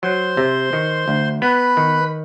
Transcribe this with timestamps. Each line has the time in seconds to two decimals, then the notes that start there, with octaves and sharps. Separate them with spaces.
0.03 F#3 C5 C6
0.37 C3
0.73 D#3
1.08 D2
1.42 B3 B4 B5
1.77 D#3